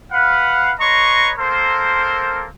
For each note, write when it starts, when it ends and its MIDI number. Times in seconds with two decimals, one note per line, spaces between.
0.12 0.72 71
0.12 0.72 77
0.12 0.72 78
0.80 1.31 71
0.80 1.31 73
0.80 1.31 75
0.80 1.31 82
0.80 1.31 84
0.80 1.31 85
1.38 2.46 58
1.38 2.46 60
1.38 2.46 69
1.38 2.46 70
1.38 2.46 72